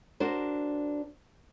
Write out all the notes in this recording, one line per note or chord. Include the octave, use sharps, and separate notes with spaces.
D4 F#4 A#4 C5